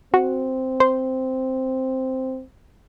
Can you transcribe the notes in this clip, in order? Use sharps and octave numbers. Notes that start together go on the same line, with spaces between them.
C4 F#4
C5